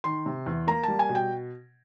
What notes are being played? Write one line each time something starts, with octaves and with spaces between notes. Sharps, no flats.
D#3 C6
C3
E2
A#3 A#5
G3 A5
G#5
B2
G5